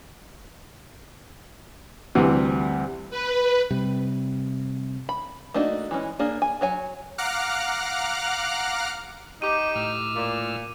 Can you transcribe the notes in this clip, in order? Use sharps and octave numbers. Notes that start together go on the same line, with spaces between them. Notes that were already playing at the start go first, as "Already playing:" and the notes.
D2 C3 E3 G3
B4
C3 G3
B5
A3 A#3 D4 D#4 F#4
E3 G#3 C#4
A#3 D4 G#4
G#5
F#3 C#5 G#5
F5 F#5 A#5 D6 F6 F#6
D#4 G4 D6 D#7
A2 E6 F6
A#2